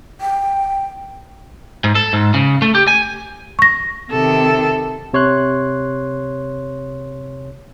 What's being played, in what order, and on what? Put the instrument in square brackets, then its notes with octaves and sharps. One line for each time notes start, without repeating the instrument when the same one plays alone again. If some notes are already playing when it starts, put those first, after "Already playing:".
[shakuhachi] G5
[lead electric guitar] G#2
A4
G#2
C#3
A3
G4
G#5
[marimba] C#6 A#6
[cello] C3 D#3 [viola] A4
[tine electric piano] C3 C#5 C6 F#6